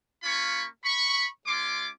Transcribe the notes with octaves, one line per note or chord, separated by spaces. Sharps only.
A#3 C#4 F4 B5 C#6
B5 C#6
G#3 C#4 F4 C6 D6